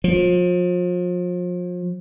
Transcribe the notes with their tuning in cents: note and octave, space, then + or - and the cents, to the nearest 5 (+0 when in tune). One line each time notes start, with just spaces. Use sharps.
F3 +35